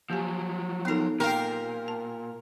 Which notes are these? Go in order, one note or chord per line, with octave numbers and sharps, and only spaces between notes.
F3 F#3 A#3 G4 G#5
B3 D#4 A4 A#4 C6
A#2 G4 A#4 C5 F5
A5